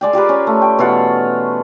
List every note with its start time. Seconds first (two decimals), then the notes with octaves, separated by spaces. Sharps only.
0.01 G#3 D5 G5
0.13 F4 G4 A#4 B4
0.29 C#4
0.47 A3
0.62 G5
0.79 B2 E3 F4 F#5